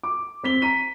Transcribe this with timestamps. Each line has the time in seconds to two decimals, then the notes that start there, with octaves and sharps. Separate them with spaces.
0.03 D6
0.43 C4 B6 G7
0.62 A#5 B6 D#7